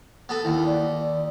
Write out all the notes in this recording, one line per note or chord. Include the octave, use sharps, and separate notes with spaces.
B3 A4
D#2 E4
D5